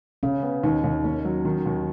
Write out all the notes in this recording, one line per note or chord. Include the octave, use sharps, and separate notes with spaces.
C#3 C#4
B3
D#2 D#4
D#2
A#3 C#4
F#3
D#3
D#2